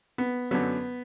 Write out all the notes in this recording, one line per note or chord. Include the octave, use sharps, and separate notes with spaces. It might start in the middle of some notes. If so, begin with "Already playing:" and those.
B3
F#2 D3 F#3 B3